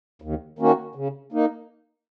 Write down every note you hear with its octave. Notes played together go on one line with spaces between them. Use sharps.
D#2
D#3 A#3 C#4 F#4
C#3
A#3 D#4